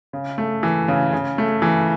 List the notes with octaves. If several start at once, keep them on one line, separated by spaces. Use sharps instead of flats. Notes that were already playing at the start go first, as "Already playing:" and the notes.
C#3
A3
E3
C#3
C#3
A3
E3